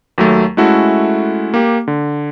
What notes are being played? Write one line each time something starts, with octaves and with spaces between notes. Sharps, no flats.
D#2 F#3 A3
G#3 A3 C#4 E4 F#4 A4
A#3 G4
D3